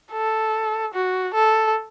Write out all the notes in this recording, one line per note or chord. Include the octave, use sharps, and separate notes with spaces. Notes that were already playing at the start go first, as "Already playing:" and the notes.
A4
F#4
A4